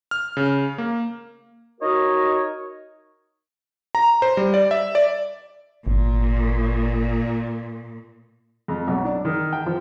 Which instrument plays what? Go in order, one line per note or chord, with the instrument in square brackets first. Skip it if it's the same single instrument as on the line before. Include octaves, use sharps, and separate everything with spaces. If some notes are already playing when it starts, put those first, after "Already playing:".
[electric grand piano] F6
C#3
A#3
[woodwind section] D#4 F#4 A#4 C#5 D#5
[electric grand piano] A#5
C5
G3
D5
E5
D5
[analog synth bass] G#1 [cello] A#2
[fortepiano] F2
B1
D4
D#3
G5
F3